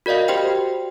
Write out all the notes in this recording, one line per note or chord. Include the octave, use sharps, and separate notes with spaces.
F#4 A#4 D5 D#5 F5
F#4 G4 C5 G5